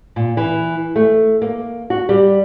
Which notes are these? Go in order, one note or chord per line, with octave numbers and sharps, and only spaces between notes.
A#2
E3
A3
A#3
F#4
G3